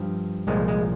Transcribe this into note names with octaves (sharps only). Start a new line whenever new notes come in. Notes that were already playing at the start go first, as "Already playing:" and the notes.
Already playing: G2 F3
C2 A#2 F3 G#3
G#3